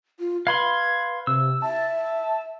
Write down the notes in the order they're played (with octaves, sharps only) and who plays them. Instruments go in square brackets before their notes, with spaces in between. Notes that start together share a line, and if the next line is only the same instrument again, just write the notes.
[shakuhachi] F4
[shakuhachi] B4 [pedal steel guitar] F5 B5 C6 [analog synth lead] G#6
[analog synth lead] C3 [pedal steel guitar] E6
[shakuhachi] E5 [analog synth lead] A5